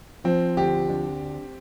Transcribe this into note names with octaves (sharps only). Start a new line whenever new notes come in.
F3 C4
D2 G4
D4